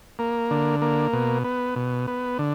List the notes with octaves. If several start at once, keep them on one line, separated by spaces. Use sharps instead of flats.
A#3
D3
A#3
B2
B3
B2
B3
D3